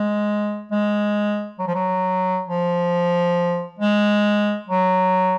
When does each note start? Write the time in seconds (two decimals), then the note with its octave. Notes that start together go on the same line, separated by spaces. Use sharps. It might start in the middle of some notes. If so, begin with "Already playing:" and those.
Already playing: G#3
0.71 G#3
1.59 F#3
1.67 F3
1.75 F#3
2.48 F3
3.79 G#3
4.68 F#3